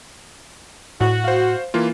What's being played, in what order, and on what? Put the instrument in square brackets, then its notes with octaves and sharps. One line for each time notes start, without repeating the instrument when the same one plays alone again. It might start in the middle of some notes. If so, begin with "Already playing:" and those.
[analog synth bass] A2 [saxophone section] F#4
[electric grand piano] C5 F5
E3 A#3 F4